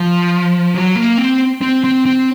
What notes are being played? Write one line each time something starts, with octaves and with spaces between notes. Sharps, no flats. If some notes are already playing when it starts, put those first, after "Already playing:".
Already playing: F3
F#3
A#3
C4
C4
C4
C4